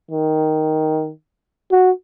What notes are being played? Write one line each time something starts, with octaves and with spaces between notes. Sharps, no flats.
D#3
F#4